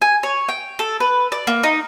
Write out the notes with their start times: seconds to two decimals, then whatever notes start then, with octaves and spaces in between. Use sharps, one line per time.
0.02 G#5
0.23 C#5
0.49 G5
0.79 A4
1.00 B4
1.32 D5
1.47 A#3
1.63 D#4